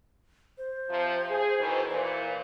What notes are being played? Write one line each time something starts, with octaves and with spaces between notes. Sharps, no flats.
C5
C3 F3
G#4
B2 D#3 E3
A#2 E3 C5